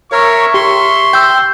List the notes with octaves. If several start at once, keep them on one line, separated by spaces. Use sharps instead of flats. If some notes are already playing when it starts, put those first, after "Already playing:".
A#4 C#5 E5 C#6
G4 C6
G5 E6 G6